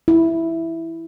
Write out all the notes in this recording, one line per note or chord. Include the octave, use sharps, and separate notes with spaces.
E4